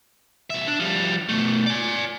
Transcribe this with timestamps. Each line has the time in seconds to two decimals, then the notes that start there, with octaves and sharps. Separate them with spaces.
0.50 B1 E5
0.67 D4
0.80 F3 G3
1.29 B2 A3
1.66 D5 G#5